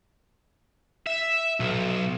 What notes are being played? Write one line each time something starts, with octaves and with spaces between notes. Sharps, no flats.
E5
B1